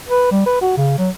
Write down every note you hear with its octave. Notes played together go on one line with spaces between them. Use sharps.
B4
G3
B4
F#4
C#3
F#3